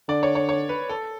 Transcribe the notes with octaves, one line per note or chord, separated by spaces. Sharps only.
D3 D5
C#5
C#5
C#5
B4
A4